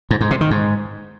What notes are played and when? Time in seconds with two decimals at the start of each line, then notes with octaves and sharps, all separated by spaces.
0.11 G#2
0.21 G#2
0.31 C3
0.41 D#3
0.51 G#2